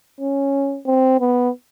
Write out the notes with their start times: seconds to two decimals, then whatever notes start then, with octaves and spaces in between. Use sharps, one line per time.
0.21 C#4
0.87 C4
1.20 B3